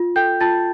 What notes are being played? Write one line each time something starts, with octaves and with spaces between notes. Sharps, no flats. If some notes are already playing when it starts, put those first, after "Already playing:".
Already playing: F4
A4 G5 G6
F4 A5 A6